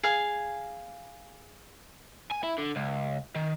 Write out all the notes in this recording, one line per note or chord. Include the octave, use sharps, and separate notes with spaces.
G#4 F5 G#5
G#5
E4
D3
C#2
D#3